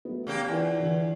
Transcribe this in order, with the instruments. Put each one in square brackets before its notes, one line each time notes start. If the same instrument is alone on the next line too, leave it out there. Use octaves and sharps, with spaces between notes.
[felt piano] F#3 A3 B3
[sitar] C#3 A#3 G4 [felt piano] A#4
[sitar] E2 [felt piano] E4 F4 G#5
[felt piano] D3 E3